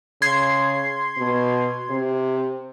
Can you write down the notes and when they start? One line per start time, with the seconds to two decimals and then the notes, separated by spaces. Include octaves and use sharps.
0.22 C#3 C6 G#6 C7
1.18 B2
1.90 C3